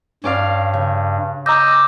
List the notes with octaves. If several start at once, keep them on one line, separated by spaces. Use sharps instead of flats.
G2 C#4 D5 F5
C#3
D#5 A#5 D6 E6 G6